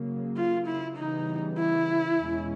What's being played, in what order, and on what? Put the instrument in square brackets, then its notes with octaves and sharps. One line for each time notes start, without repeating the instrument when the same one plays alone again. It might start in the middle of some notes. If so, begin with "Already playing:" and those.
Already playing: [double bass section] C#3 F#3 A#3
[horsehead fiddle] F4
E4
[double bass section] C#3 E3 G3 B3 [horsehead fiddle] D#4
[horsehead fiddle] E4
[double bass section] E2 B2 G#3 C#4